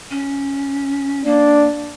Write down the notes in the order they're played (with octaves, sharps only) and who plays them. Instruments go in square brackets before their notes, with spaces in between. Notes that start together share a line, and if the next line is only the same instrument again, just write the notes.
[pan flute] C#4
[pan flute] A#3 [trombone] D4